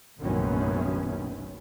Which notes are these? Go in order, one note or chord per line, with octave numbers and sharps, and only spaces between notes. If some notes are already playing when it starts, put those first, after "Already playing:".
F1 A#1 F#2 D#3 B3 C#4